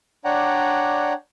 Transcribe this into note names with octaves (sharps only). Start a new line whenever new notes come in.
D4 C#5 D5 F#5 G5 A#5